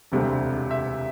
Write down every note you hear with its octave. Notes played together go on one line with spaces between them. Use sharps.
E1 D2 C3 G3 C4
E5